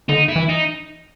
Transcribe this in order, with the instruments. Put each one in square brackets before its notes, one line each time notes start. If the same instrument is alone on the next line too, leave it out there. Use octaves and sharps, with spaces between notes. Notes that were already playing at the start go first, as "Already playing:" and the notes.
[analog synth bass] D3 [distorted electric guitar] D#4
[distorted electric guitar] E4
[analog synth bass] E3
[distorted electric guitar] D#4